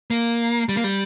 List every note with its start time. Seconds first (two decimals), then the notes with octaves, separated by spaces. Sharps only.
0.11 A#3
0.69 G3
0.77 A#3
0.84 G3